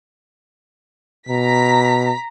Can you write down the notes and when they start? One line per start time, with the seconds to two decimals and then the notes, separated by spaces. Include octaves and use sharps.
1.29 B2 A#5 B6